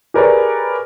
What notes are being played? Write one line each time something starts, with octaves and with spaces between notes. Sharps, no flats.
G4 G#4 A#4 B4 C#5 D5